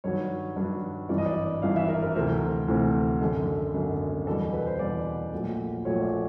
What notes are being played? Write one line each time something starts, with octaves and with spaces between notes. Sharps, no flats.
G2 D#3 F#3 C#5
G2 D#3 F#3
G#1 G2 E3 D5
D#5
D5
G#1 G2 E3 F5
E5
A#4
A#4
D2 C3 E3 A3 C4 A#4
D2 C3 E3 A3 C4
G#1 F#2 D3 A4
G#1 F#2 D3
E2 B2 G3 A4
B4
C5
E2 B2 G3 D5
A#1 A#2 F#3 A3
A#1 A#2 F#3 A3 C#5
D5